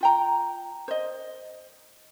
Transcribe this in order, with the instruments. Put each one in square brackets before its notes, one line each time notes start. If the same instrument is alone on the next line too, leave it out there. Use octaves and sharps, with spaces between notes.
[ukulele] F4 G5 A#5
C5 D#5